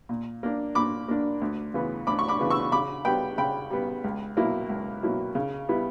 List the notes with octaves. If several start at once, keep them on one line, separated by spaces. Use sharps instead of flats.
A#2
A#3 D4
A#2 B5 D6
A#3 D4
D2
C#3 E3 B3
D2 B5 D6
C#6
B5 D6
C#3 E3 B3
C#6 E6
C#3 B5 D6
G3 B3 G5 B5
C#3 G5 B5
G3 B3
C#2
B2 F#3 A#3 E4
C#2
B2 F#3 A#3 E4
C#3
G3 B3 E4